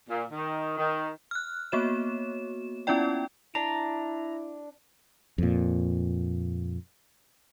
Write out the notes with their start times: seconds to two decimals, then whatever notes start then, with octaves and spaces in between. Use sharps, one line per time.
0.08 A#2
0.31 D#3
0.77 D#3
1.31 F6 F#6
1.72 A#3 B3 F#4 C#5 E7
2.87 B3 C#4 E4 F4 D5 G5
3.55 D4 E4 A#5
5.38 F2 A#2